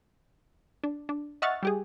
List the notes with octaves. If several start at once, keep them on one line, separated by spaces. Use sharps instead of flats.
D4
D4
D#5 E5 F#5 C#6 F6 A6
G3 G4 G#4